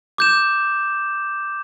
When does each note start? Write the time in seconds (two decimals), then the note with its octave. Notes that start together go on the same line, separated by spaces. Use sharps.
0.18 D6 G6 E7